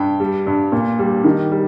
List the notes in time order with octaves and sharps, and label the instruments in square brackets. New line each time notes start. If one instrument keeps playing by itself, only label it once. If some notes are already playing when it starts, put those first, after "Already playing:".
Already playing: [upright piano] G2 G5
G3
G2
A#2
G3
D#3
G3